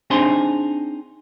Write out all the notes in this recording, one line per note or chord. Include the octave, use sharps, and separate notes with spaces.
C4 D4 D#4 G#4 C5 C6